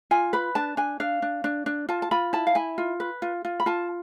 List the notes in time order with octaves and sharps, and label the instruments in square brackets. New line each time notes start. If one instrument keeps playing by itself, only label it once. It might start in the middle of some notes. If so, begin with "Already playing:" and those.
[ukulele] F4 G#5
B4 B5
D4 A5
D4 G#5
D4 F5
D4
D4
D4
F4 A5
A5
F4 B5
E4 A5
F5
E4 G#5
F4
B4
F4
F4
B5
F4 A5